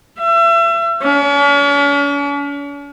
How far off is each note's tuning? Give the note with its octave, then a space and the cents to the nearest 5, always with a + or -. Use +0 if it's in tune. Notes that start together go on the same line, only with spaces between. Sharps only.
E5 +35
C#4 +45